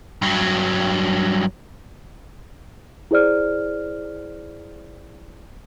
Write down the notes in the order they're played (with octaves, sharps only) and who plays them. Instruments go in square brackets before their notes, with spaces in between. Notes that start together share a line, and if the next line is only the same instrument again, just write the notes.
[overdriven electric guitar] G2 F#3
[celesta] E4 G#4 C5 D5 F6